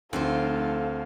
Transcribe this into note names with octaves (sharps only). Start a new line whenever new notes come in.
F1 D2 C4 F4 A4 C5 F5